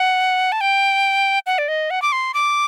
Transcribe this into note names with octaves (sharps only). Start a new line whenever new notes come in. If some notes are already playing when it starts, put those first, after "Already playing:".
Already playing: F#5
A5
G5
F#5
D5
D#5
F#5
D6
C6
D6